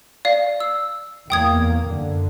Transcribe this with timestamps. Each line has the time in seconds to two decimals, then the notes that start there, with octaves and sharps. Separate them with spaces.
0.25 D5 F5
0.60 E6
1.30 E2 A#3 G5 D#6 G#6
1.83 F#2 D3